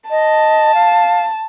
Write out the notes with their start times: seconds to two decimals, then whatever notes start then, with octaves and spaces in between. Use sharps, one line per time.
0.11 D#5 A5
0.75 F5